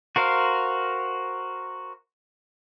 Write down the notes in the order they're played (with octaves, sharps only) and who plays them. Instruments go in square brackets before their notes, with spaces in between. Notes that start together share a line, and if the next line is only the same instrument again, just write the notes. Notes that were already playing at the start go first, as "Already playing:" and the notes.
[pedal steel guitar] F#4 A#4 C5 F5